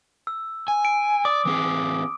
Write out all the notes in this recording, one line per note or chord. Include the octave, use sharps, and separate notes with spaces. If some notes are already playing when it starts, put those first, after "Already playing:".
E6
G#5
D7
D5 D6 D#6
E3 C4 G#4